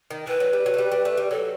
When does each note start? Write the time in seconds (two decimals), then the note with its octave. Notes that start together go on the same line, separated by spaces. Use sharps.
0.11 D#3
0.27 E3 B4
0.40 F#3
0.53 G3
0.66 F#3
0.74 A3
0.78 G3
0.92 G3
1.05 A3
1.17 G3
1.31 F#3 A4